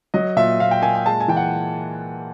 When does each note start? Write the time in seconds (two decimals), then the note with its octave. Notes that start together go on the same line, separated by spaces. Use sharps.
0.14 F#3 D#5
0.36 A#2 E5
0.60 A#2 F5
0.71 G5
0.82 A#3 G#5
0.95 G5
1.06 G#3 A5
1.20 G#5
1.28 E3 G5
1.37 F#5